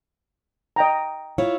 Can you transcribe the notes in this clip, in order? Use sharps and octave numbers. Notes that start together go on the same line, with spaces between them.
D#5 G5 A#5
E4 F4 C#5